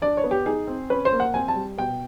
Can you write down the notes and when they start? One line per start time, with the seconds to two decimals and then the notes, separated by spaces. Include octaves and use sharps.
0.02 D4 D5
0.17 C#5
0.24 B3
0.31 G4
0.46 D#4 G#4
0.67 C4
0.90 C#4 B4
1.05 C5
1.12 A#3
1.20 F#5
1.34 C4 G#5
1.48 A5
1.55 G3
1.78 B2 G5